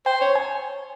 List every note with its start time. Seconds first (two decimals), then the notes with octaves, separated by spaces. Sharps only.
0.06 C5 G5
0.21 C#5
0.35 G#5